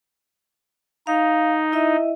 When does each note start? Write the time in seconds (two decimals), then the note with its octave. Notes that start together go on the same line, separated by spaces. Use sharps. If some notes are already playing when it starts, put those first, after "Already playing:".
1.07 D#4 F5
1.72 E4 D#5 E5